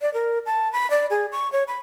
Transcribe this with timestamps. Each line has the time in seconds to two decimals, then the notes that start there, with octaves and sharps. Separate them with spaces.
0.02 D5
0.14 A#4
0.46 A5
0.73 B5
0.90 D5
1.10 G#4
1.32 C#6
1.52 C#5
1.68 B5